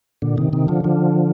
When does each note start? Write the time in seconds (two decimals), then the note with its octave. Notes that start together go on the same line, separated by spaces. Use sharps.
0.22 A#2 D3
0.37 C3 D#3
0.53 C3 D#3
0.68 D3 F3
0.84 D3 F3